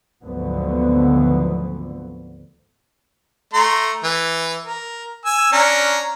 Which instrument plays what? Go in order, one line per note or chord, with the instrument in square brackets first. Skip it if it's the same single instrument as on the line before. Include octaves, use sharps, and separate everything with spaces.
[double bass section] G#1 D2 D3 F3 F#3 B3
[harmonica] A3 A#5 C6
E3
A#4
G#5 E6
C#4 D4 A#5